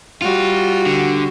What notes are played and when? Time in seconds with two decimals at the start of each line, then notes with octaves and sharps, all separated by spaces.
0.22 G3 F4 F#4
0.86 D3